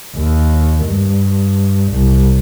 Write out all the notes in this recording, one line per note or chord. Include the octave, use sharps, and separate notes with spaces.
D#2
G2
C2